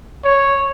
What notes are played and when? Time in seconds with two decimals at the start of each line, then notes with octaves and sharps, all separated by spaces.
0.24 C#5